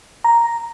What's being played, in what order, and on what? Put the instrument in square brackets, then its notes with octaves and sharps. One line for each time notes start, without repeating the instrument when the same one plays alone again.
[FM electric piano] A#5